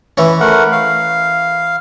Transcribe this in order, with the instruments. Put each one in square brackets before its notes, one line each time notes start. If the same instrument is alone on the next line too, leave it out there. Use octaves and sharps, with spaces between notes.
[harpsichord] E3 C#4
[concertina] A3 A#4 F#5
F5